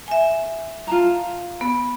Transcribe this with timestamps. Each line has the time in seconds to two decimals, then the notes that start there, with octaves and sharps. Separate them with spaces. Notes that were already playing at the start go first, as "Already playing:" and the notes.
0.08 E5 G#5
0.87 F4 A5 A#5
1.61 B3